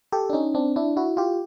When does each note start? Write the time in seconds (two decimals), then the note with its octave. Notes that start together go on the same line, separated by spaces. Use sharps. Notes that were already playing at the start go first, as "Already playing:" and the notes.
0.12 G4 A4
0.30 D4
0.33 C#4 D#4
0.55 C4 D4
0.76 D4 E4
0.97 E4 F#4
1.17 F4 G4